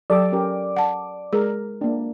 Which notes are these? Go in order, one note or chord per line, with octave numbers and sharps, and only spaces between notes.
F#3 G4 A4 D5 D6
C#4 G4 A#4
F#5 A5
G#3 G#4 A#4
A#3 D4